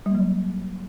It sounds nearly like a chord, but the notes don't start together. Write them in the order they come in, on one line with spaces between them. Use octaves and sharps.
G3 A#3 F#3